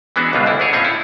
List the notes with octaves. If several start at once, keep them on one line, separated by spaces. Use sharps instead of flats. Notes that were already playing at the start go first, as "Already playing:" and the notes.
E3 G#3 B3 C#4 D4 F#4
C#2 B2 G3 F4
D2 E4
D4 G#4 C#5
A2 C4 C#4 F4 C#5
E4